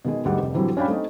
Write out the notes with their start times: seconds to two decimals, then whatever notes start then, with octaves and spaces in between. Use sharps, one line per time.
0.05 B2 D#3 G#3 G#4
0.25 D2 G#2 G3 F#5
0.38 F1
0.54 A2 D3 E3 F#3 G3 C4
0.77 C#4 D4 F5 G5 B5
0.88 A3 C4 D#4 D#5